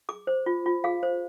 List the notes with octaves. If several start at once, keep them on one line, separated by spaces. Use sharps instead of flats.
G#4 D6
C5
F4
F4
G#4 F5
C5